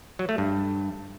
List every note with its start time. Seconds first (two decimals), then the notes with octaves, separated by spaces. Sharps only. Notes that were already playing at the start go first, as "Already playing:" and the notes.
0.19 F#3
0.29 A3
0.38 G2